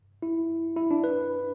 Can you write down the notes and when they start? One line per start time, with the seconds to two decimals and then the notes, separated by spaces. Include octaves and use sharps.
0.22 E4
0.77 E4
0.91 D4
1.04 B4